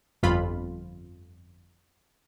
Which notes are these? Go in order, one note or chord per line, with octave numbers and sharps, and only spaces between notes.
G1 F2 F4 B5